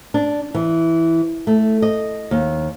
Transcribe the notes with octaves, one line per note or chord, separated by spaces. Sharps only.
D4
E3
A3
D#5
D#2